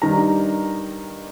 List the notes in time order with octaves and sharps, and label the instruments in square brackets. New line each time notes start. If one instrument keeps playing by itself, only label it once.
[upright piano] G2 D#3 G3 A#5